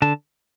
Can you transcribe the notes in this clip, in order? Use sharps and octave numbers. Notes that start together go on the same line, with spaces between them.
D3 A5